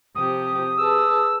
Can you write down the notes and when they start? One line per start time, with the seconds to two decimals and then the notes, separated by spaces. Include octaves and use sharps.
0.15 C3 F3 G4 D#6
0.78 G#4 B4 A5 E6